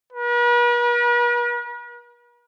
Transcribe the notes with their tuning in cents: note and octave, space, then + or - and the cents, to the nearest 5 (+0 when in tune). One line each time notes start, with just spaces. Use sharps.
B4 -45